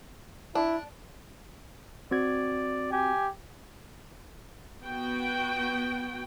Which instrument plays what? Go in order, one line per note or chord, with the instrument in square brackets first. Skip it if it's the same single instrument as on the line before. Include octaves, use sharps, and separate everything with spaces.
[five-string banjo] D4 [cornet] E4
[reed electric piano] C4 F#4 G#6 [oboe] D5
[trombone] G4 [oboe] G#5
[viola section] B3 F#4 G5